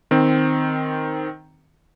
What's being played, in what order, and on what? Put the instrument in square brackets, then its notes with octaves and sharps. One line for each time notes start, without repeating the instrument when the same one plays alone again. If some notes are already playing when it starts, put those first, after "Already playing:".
[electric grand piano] D#3 C4